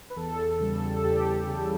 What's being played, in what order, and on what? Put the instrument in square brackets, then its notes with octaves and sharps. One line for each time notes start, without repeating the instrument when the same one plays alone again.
[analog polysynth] B4
E2 A4
C#3 G3 A4
A4
E2 G4
C#3 G3